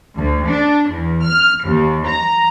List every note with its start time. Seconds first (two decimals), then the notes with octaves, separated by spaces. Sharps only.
0.15 D2
0.46 D4
0.90 E2
1.24 F6
1.64 D#2
2.07 A#5